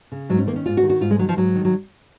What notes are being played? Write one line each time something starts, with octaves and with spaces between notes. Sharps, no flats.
C#3
G#2 F#3
C#4
D#3 A#3
C#4
G#2 F4
F#4
D#3
F#4
G#2 F4
G#3
D#3 F#3
F3
G#2 F#3
D#3
F#3